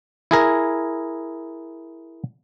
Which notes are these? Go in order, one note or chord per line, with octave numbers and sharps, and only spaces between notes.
E4 G#4 A#4